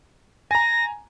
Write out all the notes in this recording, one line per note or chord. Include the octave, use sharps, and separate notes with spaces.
G#5 A#5 A#6